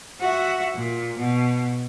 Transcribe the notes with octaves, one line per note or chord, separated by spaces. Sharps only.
F#4 E5
A#2
B2